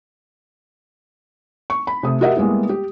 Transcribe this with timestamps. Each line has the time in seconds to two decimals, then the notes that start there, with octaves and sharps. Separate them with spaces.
1.70 C#6
1.87 B5
2.03 C3 A3 D#6
2.21 F#4 G4 A#4 D#5 E5 F#5
2.36 G3 G#3 A#3 B3 E4
2.69 G4